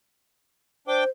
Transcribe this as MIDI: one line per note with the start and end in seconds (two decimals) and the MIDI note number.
0.88 1.04 62
0.88 1.09 72
0.88 1.04 79
0.88 1.04 86